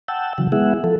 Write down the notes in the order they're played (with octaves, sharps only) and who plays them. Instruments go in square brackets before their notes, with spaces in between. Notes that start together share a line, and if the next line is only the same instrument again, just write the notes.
[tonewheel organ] F#5 G5 A5 E6
C#3 E3 F#3
G#3 B3 E4 G#4 E5 F#5
F3 A4